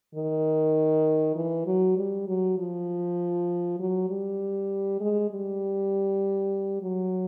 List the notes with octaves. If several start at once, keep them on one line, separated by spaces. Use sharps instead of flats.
D#3
E3
F#3
G3
F#3
F3
F#3
G3
G#3
G3
F#3